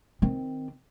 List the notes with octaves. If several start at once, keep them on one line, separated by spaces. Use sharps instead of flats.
D#3 C4